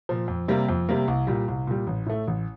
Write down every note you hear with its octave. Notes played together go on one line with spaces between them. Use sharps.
A#2 F3
F2
C3 G3 A#3
F2
C3 G3 A#3
C2
A#2 G3
C2
A#2 G3
A1
A2 A3
A1